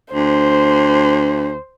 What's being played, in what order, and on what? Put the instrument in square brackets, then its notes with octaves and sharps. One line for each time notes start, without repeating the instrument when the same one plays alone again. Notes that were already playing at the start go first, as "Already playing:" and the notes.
[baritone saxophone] D2 [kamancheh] C5